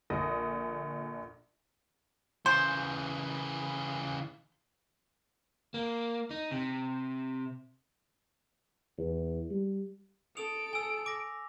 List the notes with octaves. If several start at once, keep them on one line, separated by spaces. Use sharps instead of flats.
A#1 D3 D#6 A#6
C#3 E3 C5
A#3
D#4
C3
E2
G3
A4 D#6 D7 F7
G#5 E6
D6 A#6